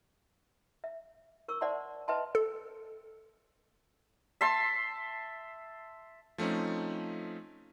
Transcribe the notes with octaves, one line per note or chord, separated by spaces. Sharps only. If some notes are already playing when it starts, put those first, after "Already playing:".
E5
A#4 C#6 E6
C5 D5 E5 F#5 A5 C6
B4 D#5 E5 G5 A5 C6
A4
E5 A5 C6
F3 A3 C4 C#4 D#4